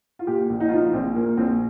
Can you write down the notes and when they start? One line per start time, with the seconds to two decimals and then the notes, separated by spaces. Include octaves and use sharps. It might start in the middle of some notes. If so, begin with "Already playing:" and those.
0.19 F4
0.27 A#2 G4
0.50 A#1
0.60 D#4
0.69 F3 F4
0.77 D#4
0.93 A#1 C4
1.15 A#2 A#3
1.37 A#1 C4